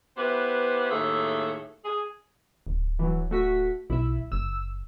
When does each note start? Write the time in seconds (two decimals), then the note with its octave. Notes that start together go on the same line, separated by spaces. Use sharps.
0.17 B3 E4 G4 B4 C5
0.91 D#2 A2 G#4 A4 E5
1.85 G#4
2.67 D1
2.99 E3 F#3
3.31 A3 F#4 B6
3.90 B1 E4 E5
4.32 F#1 E6